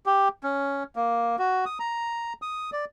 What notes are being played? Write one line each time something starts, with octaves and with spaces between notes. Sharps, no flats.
G4
C#4
A#3
F#4
D#6
A#5
D#6
D5